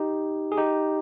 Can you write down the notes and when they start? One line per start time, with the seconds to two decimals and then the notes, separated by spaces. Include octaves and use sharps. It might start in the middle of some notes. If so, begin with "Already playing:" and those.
Already playing: D#4 G4
0.52 G#4
0.57 D#4 G4